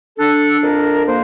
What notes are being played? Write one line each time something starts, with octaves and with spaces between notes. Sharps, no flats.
D4 A4
F2 A#4
A#3 C5